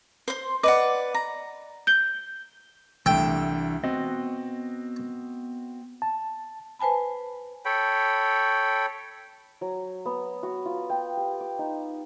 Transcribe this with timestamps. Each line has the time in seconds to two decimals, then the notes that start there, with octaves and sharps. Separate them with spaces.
0.28 C5 C6
0.63 B4 D5 D#5 F#5 D6
1.14 A#5
1.87 G6 G7
3.06 C2 E3 A3 D4 G5 E6
3.84 B3 C4 F#4 D#5
6.02 A5
6.79 B4 C5 G#5 A5 B5
7.65 A4 C#5 G5 B5
9.61 F#3
10.05 B3
10.43 F#4
10.66 F4
10.90 G5
11.17 G4
11.40 D6
11.59 D#4